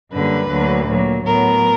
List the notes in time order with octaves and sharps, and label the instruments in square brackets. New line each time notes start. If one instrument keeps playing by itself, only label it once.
[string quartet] F#2 D3 G3 A#3 B4
D2 D3 F#3 A#3
A#2 F#3 A#3
A2 F#3 B3 A#4